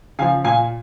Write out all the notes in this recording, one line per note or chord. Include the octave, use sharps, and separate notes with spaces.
C#3 F3 F5 G#5
A#2 F5 G#5